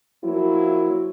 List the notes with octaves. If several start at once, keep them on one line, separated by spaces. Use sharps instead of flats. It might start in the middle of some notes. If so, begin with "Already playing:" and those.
F3 F#3 A#3 E4